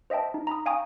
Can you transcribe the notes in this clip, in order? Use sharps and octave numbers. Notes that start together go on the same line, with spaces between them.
C5 D#5 E5 G5 A5
D#4
A#5 B5 D#6
F5 G5 G#5 A#5 C#6 D#6